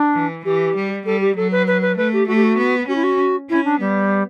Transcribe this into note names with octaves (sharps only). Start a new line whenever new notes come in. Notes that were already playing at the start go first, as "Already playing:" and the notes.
Already playing: D4
E3
E3 G4
G3
G3 A4
G4
F#3 A4
B4
B4
B4
A3 B4
G4
A3 F#4
G4
F#4
B3
C#4 F#4
E4
F#4
C#4 E4
D4
G3 B3